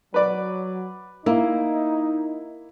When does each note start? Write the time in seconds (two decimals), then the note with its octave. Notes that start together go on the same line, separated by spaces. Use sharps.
0.14 F#3 B4 D5
1.26 A#3 D#4 E4